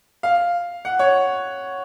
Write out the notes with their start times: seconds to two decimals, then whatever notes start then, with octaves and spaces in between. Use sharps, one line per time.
0.23 F5
0.85 F#5
0.99 C#5